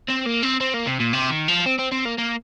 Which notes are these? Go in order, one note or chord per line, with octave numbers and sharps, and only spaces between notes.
C4
A#3
C4
C4
A#3
C3
A#2
C3
D#3
F3
C4
C4
C4
A#3
A#3